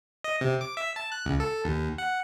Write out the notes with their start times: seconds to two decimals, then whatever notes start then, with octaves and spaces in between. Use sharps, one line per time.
0.24 D#5
0.41 C3
0.61 D6
0.77 E5
0.96 A5
1.12 F#6
1.26 C#2
1.40 A4
1.65 D#2
1.98 F#5